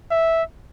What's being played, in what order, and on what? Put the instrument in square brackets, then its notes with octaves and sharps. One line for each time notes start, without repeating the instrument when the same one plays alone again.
[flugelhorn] E5